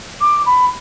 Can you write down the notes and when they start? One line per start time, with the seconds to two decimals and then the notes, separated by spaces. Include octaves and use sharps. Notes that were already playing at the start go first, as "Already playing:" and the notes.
0.21 D6
0.46 B5